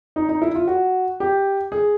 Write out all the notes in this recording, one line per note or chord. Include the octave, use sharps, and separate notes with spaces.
D#4
D#4
E4
F4
F#4
G4
G#4